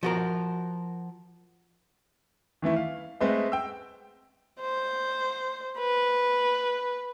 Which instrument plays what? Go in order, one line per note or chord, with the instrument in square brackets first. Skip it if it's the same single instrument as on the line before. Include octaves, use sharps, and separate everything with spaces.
[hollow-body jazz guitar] F3 F#4 A#4
[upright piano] D#3 E3 A3 E4
F5
G#3 A3 C4 B4 C5 D#5
G5 E6
[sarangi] C5
B4